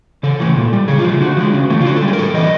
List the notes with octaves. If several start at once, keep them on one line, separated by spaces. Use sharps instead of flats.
C#3 A4
E3 A3
A#2
G3
C#3 G#4
F4
F3 A3 F#4
D3 F#4
F3 G#3
C#3
E3 A3
F4
D3 F#4
A4
G3
G#4
A#4
A2 A4
E3 G3 D#5